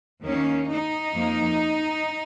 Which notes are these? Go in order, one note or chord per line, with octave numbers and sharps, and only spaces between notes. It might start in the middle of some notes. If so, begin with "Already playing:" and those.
D#2 D#3 A#3 C#4
D#4
F2 F3 A#3